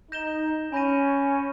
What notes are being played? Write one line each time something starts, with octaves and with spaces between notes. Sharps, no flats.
D#4 G6 A#6 E7 G7
C#4 G#5 B5 G6 A#6 D#7